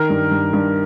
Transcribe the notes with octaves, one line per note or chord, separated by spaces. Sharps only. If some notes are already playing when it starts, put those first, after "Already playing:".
Already playing: D#3 A#4
G2
G2
G2